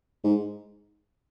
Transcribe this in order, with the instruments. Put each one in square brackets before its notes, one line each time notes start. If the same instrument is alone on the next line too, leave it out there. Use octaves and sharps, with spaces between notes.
[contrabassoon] G#2